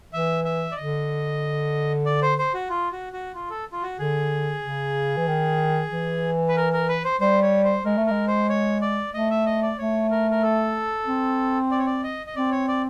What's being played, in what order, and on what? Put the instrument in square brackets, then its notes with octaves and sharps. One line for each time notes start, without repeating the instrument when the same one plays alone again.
[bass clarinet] E3 [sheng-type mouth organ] E5
[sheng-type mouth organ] E5
D5
[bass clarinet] D3 [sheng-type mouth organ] D#5
[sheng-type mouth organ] D5
C5
C5
F#4
F4
F#4
F#4
F4
A4
F4
F#4
[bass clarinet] D3 [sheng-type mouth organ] G#4
[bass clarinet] C#3
E3
D#3
E3
[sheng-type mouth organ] B4
A#4
A#4
B4
C5
[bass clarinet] G3 [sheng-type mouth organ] C5
[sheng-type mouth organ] C#5
C5
[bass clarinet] G#3 [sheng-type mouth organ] A#4
[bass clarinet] A3
[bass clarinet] G#3 [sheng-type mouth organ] A#4
[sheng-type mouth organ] C5
C#5
D5
[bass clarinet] A3 [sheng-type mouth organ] D#5
[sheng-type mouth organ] E5
D#5
D5
[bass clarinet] A3 [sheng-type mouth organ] C#5
[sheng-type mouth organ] A#4
A#4
A4
[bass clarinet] C4
[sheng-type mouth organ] D5
C#5
D5
D#5
D#5
[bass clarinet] C4 [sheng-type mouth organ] D5
[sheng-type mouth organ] C#5
D5